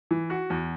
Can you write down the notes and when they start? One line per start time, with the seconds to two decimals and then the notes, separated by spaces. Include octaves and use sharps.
0.11 E3
0.30 F#4
0.50 E2